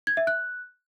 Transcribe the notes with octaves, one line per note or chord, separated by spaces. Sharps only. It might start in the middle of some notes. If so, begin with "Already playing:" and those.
G#6
E5
F#6